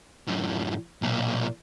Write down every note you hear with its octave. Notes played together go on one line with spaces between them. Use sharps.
F#2 A2
B1 A#2